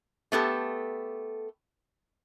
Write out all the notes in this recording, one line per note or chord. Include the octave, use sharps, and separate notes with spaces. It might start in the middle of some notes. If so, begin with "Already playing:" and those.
A3 B3 G4 A4